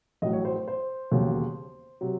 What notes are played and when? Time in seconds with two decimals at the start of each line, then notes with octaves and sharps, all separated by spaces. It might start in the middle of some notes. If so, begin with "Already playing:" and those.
0.22 A1 A2 F#3 D#5
0.33 C#5
0.45 C5
0.56 C5
0.68 C5
1.11 E1 D#2 C#3 F#3
2.01 C3 F#3